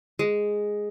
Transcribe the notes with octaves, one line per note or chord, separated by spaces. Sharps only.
G#3